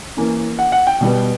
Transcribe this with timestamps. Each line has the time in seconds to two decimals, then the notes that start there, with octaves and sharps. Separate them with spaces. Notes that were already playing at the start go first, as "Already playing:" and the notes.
0.17 E3 A#3 C#4
0.59 F#5
0.72 F#5
0.87 G5
1.01 B2 G3 B3